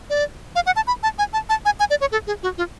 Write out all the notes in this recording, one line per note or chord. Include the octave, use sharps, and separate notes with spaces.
D5
F5
F#5
A5
B5
A5
G#5
A5
A5
G#5
G#5
D5
C#5
A4
G#4
F#4
F4